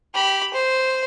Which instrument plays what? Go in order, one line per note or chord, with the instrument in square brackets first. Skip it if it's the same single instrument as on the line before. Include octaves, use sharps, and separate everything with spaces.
[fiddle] G4 B5
C5